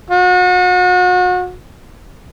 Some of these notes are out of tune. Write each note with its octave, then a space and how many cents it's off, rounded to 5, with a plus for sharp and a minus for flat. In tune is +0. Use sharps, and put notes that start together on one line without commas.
F#4 -35